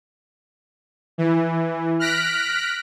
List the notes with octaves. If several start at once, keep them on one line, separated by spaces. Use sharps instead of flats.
E3
F6 F#6 A#6 B6 D7